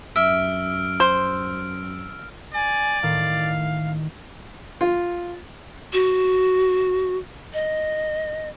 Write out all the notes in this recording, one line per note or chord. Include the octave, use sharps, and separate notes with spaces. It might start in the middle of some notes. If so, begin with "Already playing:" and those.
F#2 E5 E6 F6 D7
C5
D5 G#5
A2 D#3 F5
F4
F#4
D#5